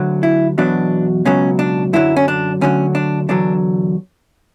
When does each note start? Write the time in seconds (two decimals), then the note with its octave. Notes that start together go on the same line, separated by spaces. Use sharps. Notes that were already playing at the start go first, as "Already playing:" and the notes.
Already playing: D2 D3 F#3
0.23 E4
0.58 E2 B2 F#3 D4
1.25 C#2 B2 F#3 C#4
1.59 D4
1.93 F#2 D3 F#3 E4
2.17 C#4
2.28 D4
2.61 D2 D3 F#3 C#4
2.95 D4
3.29 E2 D3 F#3 D4